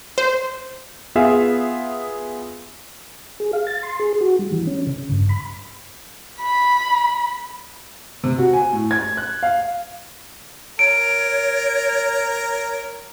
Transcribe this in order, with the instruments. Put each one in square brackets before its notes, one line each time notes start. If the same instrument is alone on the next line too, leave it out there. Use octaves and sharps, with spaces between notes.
[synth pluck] C5
[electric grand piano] B3 F4 G#4 E5 F5
[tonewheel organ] G#4
F5
A6
C6
G#4
F#4
G3
E3
C#4
C#3
G2
B5
[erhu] B5
[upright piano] C3
F#4
G#5
A2
G#6
F#6
F5
[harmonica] A#4 [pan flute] C#5 [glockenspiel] D7